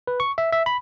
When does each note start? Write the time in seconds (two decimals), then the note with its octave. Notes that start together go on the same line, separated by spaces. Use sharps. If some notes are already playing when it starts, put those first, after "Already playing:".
0.07 B4
0.20 C#6
0.38 E5
0.53 E5
0.66 B5